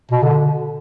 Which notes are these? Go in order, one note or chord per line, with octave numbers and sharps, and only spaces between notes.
B2
D3